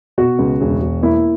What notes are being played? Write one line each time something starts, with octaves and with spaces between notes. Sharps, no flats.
B2 F#4
C#2
E1
E1
A#3 E4